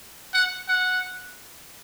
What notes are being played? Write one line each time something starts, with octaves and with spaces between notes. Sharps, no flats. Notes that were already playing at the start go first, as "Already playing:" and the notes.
F#5
F#5